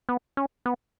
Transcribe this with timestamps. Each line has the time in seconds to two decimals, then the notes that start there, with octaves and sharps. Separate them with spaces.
0.09 B3
0.37 C#4
0.66 B3